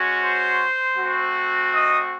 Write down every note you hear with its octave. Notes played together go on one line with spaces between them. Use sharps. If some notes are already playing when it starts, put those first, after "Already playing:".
Already playing: G#3 C#4 F#4
C5 C6
A3 C4 F#4
D#5 D#6